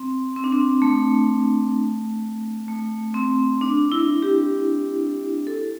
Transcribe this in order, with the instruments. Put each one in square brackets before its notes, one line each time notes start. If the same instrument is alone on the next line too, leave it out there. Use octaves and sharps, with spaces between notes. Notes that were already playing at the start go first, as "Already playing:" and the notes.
Already playing: [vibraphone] C4
C4
D4
C4
A3
A3
C4
D4
E4
G4
A4